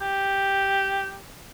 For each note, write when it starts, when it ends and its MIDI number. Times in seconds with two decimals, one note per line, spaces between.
0.02 1.18 67